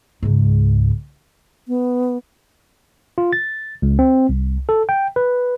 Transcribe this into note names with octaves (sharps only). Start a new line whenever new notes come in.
C#2 G#2
B3
F4
A6
C#2
C4
C2
A4
G5
B4